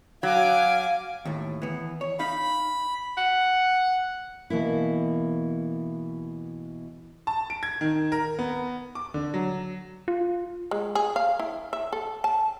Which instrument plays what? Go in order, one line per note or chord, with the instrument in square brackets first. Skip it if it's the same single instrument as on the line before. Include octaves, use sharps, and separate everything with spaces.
[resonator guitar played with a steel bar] F#3 [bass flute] F5 [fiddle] G#5 D6
[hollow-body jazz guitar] D#2 A2
E3 B3
C#5
[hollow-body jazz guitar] D#4 F5 [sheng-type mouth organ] B5
[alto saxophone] F#5
[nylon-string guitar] B2 E3 A#3 E4
[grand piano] A5
D7
G#6
D#3
A#4
B3
D6
D3
F#3
[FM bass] F4
[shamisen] G#3
G#4
F5
E4
E5
A4
A5